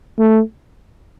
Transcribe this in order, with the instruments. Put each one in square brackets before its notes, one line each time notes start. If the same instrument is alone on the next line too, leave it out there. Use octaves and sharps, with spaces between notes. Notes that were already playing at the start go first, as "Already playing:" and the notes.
[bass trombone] A3